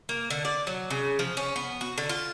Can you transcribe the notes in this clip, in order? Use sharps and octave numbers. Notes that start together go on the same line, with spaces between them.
A#3
D3
D5
F#3
C#3
F3
C#4
B3
F#4
D3
F4